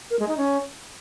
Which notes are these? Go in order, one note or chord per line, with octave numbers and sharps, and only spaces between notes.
A#4
G#3
D#4
C#4